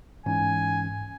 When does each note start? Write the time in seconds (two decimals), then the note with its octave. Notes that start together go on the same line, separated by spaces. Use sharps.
0.26 G#2 E3 C#4 G#5